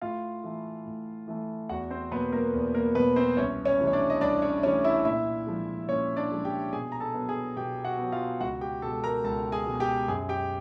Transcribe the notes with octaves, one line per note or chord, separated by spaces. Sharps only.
A2 F4 F5
E3 A3
A2
E3 A3
E2 F#4 F#5
C4 C5
B2 F#3 A#3 B3 B4
A#3 A#4
E2
A#3 A#4
B2 F#3 A#3 B3 B4
C4 C5
C2 C#4 C#5
C#4 C#5
C3 E3 A3
C#5
D4 D5
D#5
C2 D4 D5
C#4 C#5
C3 E3 A3 C#4 C#5
E4 E5
A#2 E4 E5
F3 G#3
A#2 C#4 C#5
D4 D5
F3 G#3
G4 G5
B2 G#4 G#5
A#5
A4 A5
F#3 B3
G#4 G#5
B2 G4 G5
F#4 F#5
F#3 B3
F4 F5
C#2 F#4 F#5
G4 G5
B2 G#3 A4 A5
A#4 A#5
C#2 A4 A5
G#4 G#5
B2 G#3
G4 G5
F#2 G#4 G#5
G4 G5